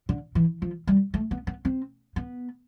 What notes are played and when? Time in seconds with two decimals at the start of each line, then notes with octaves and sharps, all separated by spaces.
0.09 D3
0.35 E3
0.62 F3
0.87 G3
1.14 A3
1.31 B3
1.47 B3
1.65 C4
2.16 B3